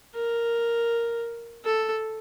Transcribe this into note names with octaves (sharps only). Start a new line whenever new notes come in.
A#4
A4